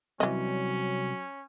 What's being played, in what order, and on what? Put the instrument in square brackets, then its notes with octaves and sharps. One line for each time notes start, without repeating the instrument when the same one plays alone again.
[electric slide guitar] C3 G3 C4 [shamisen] E3 D#5 [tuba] F#3 [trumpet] C#4